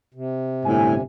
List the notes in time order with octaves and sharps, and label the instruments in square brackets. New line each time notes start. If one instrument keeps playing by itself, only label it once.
[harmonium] C3
[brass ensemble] G1 G#5 [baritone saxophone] A2